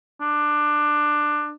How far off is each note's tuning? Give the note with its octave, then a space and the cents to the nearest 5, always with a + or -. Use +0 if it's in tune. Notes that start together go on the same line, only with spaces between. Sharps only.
D4 +15